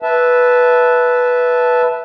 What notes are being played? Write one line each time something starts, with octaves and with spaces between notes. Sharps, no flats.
B4 E5 A5